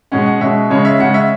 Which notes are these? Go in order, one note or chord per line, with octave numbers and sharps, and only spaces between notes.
B2 G#3 C#4 F#5
F#5
B2 G#3 C#4 E5
C#3 G#3 C#4 C#5
E5
C#3 G#3 C#4 F#5
E5